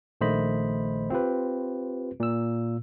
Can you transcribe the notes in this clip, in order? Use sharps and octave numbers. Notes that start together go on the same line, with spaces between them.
A#1 D#3 A3 C5 D#5 B5
C4 F4 G4 B4
A#2 E6